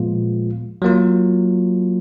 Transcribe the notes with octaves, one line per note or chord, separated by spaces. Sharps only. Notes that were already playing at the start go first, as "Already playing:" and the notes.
Already playing: A#2 F3 G#3 B3 F4
F#3 A#3 F4